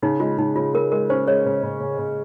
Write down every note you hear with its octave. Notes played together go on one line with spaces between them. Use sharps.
C#3 D#4
G#3 F4
C#3 D#4
C#3 F4
C#3 A#4
G#3 A#4
C#4 C5
G#3 C#5
C#3
C#3
C#3
C#3